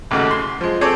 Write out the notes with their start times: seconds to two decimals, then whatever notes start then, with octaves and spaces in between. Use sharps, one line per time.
0.11 A1 D#2 C#3 F#4
0.31 C6
0.61 F3 G#3
0.81 C4 G#4 A4 C#5 D6